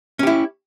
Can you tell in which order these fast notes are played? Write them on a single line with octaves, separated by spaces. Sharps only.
C#4 G4 E4